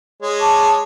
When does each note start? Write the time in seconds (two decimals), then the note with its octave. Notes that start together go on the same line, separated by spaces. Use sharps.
0.22 G#3 C#5
0.39 A5 C#6 D6